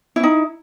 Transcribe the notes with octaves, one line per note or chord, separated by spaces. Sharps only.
C#4 D#4 E4